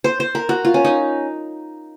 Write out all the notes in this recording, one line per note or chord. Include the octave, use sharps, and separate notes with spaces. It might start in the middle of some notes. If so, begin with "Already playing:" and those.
C5
C5
A#4
F#4
F4
C#4
D#4